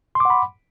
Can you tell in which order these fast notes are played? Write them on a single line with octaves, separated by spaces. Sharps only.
C6 D6 F#5 B5